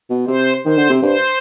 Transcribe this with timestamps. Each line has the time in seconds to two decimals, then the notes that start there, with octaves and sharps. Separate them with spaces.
0.10 B2
0.27 C3 C5
0.65 D#3 C5
0.77 D3
0.90 C3
1.02 G2 C5